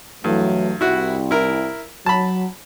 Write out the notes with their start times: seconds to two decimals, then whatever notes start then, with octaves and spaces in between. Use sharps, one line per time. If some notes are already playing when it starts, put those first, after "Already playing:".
0.24 G2 E3 F#3 A3
0.81 C2 E4 F#4
1.31 E4 A#4
2.06 F#3 A5 B5